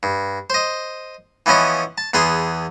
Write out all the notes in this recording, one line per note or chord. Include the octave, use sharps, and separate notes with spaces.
G2
C5 D#5
E3 F3 B3 C#4 D#5
A5
E2 B3 G#4 C6